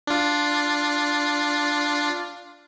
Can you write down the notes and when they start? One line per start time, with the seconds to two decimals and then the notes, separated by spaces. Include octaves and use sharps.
0.07 D4 F4